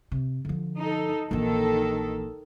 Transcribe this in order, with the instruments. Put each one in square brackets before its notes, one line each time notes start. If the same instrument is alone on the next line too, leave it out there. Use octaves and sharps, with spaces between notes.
[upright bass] C3
D3 F3
[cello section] D#4 A4
[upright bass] A#1 E3 [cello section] D#3 A4